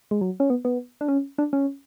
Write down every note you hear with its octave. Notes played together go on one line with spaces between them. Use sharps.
G#3
F#3
C#4
B3
B3
D4
C#4
D4
C#4